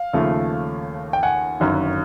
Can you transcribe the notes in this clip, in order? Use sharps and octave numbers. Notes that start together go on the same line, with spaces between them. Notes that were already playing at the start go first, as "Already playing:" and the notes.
Already playing: F5
D#2 C#3 F3 A3
G5
F#5 G#5
G1 F#2 D#3